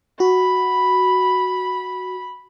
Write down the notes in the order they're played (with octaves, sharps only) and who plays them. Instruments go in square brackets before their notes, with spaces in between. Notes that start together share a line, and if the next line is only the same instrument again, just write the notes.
[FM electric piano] F#4 [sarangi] B5